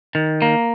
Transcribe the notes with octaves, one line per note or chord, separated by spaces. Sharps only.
D#3
A#3